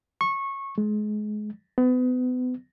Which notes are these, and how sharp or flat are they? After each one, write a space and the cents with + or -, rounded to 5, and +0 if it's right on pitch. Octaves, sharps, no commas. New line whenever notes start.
C#6 -20
G#3 +30
B3 +35